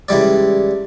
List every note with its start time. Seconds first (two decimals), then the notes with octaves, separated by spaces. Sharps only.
0.09 C#2 E3 G3 D5